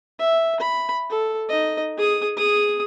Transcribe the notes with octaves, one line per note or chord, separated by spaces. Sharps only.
E5
B5
A4
D#4 D#5
G#4 D#6
G#4 D#6